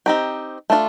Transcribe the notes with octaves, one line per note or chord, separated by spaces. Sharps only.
C4 D#4 G4
A3 D4 F4